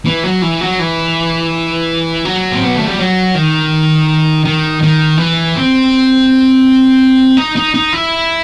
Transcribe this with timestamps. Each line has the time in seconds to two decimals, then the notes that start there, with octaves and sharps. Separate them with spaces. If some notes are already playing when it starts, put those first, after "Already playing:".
0.05 E3
0.24 F#3
0.42 E3
0.61 F#3
0.79 E3
2.25 F#3
2.52 C4
2.64 B3
2.75 A3
2.87 G3
2.98 F#3
3.35 D#3
4.45 D#3
4.82 D#3
5.17 E3
5.55 C4
7.37 D#4
7.56 D#4
7.74 D#4
7.93 E4